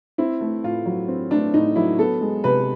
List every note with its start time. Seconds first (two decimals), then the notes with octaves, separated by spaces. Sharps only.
0.18 C4 E4
0.41 A3
0.64 A2 F4
0.86 F#3
1.08 C4
1.31 A3 D4
1.54 A2 D#4
1.76 F#3 E4
1.98 B3 A4
2.21 G#3
2.44 C3 B4